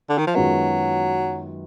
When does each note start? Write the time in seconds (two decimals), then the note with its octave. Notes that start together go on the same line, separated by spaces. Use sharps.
0.10 D3
0.18 D#3
0.27 F3
0.35 F#2 D#3 F#3 G#3 B3 F4